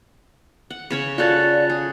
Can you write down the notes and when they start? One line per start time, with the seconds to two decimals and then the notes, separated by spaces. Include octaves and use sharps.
0.70 F#5
0.90 C#3 C#4 C#5
1.18 F4 F#4 A4 C#5 D5 F#6 A6
1.70 G#4